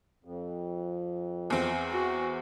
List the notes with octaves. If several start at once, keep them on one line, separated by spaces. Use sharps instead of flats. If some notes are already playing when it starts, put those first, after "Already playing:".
F2
E2 C4
F#4